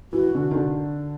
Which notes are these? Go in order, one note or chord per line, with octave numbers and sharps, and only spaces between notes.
E3 F#4
D3
D#3
D3